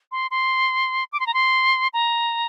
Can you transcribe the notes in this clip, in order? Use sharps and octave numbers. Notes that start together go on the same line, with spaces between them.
C6
C6
D6
C6
A#5
C6
A#5